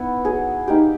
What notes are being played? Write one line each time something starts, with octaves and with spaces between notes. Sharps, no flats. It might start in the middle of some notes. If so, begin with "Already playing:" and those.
Already playing: B3 E4
F#3 G#4
A#3 D#4 G4